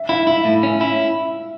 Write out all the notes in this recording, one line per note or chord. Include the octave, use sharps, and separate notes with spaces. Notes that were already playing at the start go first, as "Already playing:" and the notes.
Already playing: E5
E4 F5
E4 E5
A2
C#4
E4